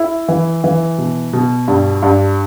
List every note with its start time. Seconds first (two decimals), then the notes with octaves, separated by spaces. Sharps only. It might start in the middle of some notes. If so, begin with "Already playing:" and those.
Already playing: E4
0.28 E3
0.64 E3
0.98 B2
1.33 B2
1.68 G2
2.03 G2